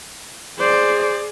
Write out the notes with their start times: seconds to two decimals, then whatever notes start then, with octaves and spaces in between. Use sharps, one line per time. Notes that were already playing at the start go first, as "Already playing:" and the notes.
0.59 G#4 C5 D5